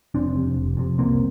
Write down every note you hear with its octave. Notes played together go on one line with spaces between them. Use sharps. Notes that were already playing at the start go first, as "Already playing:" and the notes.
F1 C4 D4
F2 C3
F1
F2 C3
C2 A#3 C4